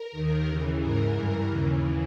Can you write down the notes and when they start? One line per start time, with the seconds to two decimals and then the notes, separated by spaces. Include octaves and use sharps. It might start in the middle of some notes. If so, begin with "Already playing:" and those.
Already playing: A#4
0.12 D#2 D#3
0.46 D#2 C#3 E3
0.79 G#2 E3 A#4
1.14 G2 E3
1.48 D#2 C#3 E3